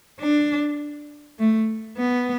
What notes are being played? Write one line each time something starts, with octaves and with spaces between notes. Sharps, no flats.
D4
A3
B3